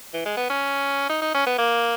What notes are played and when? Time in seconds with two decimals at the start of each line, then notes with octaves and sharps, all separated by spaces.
0.14 E3
0.26 G#3
0.37 B3
0.50 C#4
1.09 D#4
1.21 D#4
1.34 C#4
1.46 B3
1.58 A#3